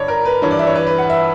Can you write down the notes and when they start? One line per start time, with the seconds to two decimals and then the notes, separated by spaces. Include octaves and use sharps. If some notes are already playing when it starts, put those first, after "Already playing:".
Already playing: G2 D3 C#5 D5
0.08 A#4
0.25 B4
0.42 G2 E3 C#5
0.51 D5
0.59 E5
0.67 C#5
0.75 B4
0.87 B4
0.98 F#5
1.10 E5